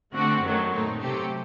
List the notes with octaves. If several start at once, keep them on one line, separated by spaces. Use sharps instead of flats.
D3 A3 C4 F#4
F#2 D#3 F#3 A3 D#4
A#2 A3 C4 D#4
C3 F#3 A3 C4 G4